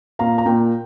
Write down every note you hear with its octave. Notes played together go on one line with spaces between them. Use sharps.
A#2 F5 A#5
A#5
A#2 G5